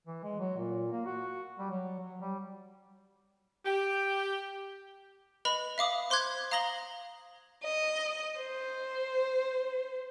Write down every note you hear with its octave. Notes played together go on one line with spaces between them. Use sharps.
E3
G#3
F#3
A#2
A#3
F#4
G3
F#3
F#3
G3
G4
B4 D#5 B5 F7
E5 F5 D6 D#6
C5 C6 D6 F#6 G#6
F5 A#5 D#6 A#6 F#7 G7
D#5
C5